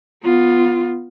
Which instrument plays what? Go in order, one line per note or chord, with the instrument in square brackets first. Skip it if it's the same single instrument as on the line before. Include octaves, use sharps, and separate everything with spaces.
[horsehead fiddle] B3 F4